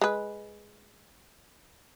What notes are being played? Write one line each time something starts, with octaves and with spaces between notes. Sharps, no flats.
G#3 B4